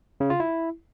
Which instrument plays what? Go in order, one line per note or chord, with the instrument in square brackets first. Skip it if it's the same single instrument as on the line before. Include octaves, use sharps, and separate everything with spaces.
[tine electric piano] C#3
F4
E4